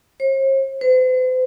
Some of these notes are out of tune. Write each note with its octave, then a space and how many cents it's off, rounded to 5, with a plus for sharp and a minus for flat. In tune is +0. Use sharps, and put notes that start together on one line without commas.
C5 +45
C5 -45